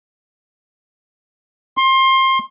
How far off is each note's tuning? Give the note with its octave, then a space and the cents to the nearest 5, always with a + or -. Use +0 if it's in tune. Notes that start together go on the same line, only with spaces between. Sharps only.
C6 +25